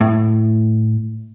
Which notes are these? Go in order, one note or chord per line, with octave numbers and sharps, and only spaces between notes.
A2